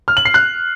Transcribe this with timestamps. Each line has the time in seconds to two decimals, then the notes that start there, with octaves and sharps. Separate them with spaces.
0.08 F6
0.17 F#7
0.25 C7
0.34 F#6